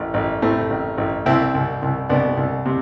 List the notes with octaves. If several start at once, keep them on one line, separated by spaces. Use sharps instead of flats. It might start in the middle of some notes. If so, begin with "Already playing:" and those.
Already playing: A1
A1
A2 A3 C4
A1
A1
C2 C4 E4
C2
C2
C2 B3 D4
C2
C3